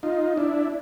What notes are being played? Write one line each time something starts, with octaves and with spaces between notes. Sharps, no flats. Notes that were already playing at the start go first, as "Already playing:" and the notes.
D#4 F4
D4 E4